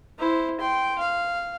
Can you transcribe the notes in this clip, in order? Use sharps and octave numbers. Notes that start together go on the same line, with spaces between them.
E4 C5
G5 C6
F5